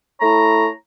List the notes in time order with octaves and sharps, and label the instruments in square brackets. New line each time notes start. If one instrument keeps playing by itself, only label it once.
[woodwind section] A3 E4 C#5 A#5